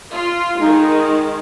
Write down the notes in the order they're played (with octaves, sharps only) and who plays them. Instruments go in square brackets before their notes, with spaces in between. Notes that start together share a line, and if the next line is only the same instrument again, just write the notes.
[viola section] F4
[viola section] D#3 G#3 [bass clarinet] D#4